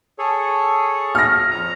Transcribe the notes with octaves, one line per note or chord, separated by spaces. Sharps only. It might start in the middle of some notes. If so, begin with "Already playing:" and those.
G#4 A4 C#5
F6 A#6
F2 A#5